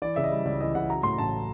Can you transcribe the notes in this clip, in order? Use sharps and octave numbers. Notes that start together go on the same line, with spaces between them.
E3 D5
C#3 E5
D#5
G3
C#2 D5
E3 D#5
C#3 F#5
F#3 A#5
A2 C6
A1 A5